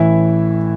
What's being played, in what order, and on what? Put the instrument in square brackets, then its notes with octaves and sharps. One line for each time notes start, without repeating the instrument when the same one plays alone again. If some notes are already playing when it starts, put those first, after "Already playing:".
Already playing: [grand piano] A1 A2 E3 E4 E5